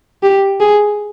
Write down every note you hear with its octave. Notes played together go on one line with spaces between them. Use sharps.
G4
G#4